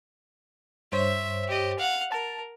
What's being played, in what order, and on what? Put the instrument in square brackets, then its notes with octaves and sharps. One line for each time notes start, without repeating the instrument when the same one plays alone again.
[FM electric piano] G2 C5 C#5 [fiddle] E5
[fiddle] G4 D#5
F5 F#5
[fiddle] A#4 [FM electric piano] A5